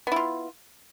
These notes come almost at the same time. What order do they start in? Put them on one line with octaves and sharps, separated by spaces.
B3 E4 F4